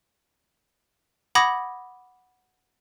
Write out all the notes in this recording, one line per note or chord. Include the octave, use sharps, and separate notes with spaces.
F#5 B5 D6 D#6 G#6 A#6